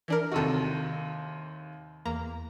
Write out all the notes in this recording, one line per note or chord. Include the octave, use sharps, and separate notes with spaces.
E3 D4 A#4
D#2 C3 D#4 F#4 A4
E2 A#3 A#5